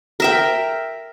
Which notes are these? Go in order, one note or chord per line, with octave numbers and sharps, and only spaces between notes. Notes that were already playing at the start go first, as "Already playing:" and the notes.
A#4 E5 G5